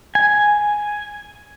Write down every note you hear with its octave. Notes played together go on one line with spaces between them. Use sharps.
G#5